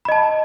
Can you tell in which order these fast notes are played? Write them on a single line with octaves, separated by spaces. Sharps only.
B5 D#5 A5